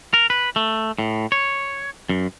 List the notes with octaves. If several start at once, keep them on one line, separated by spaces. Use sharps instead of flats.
A#4
B4
A3
A2
C#5
F#2